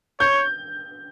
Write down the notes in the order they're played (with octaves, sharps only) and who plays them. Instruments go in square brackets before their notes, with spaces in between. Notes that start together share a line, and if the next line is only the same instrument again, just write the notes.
[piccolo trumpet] C#5 [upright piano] G6